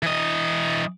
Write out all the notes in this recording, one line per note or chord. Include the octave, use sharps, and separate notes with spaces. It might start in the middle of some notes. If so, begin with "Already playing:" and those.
E3 D#5